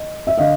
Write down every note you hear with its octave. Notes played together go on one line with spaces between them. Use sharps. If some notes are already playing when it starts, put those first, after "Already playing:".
Already playing: D#5
E5
D3 D#5 F5